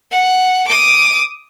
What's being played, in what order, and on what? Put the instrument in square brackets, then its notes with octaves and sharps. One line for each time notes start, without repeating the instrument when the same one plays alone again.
[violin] F#5
D6 D#6